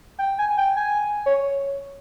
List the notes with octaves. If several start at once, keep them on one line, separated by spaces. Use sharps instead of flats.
G5
G#5
G5
G#5
C#5